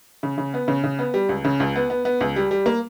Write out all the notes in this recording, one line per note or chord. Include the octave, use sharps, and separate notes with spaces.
C#3
C#3
B3
C#3
C#3
B3
G3
C#2
C#3
C#2
B3
B3
B3
C#2
G3
G3
A#3